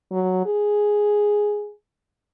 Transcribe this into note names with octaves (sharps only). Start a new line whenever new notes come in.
F#3
G#4